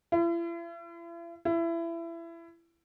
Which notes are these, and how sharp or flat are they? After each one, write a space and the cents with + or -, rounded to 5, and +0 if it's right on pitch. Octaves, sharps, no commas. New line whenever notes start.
E4 +45
E4 +25